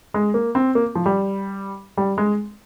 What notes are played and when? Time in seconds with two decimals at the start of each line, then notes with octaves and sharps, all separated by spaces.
0.14 G#3
0.34 A#3
0.55 C4
0.75 A#3
0.95 F3
1.06 G3
1.97 G3
2.18 G#3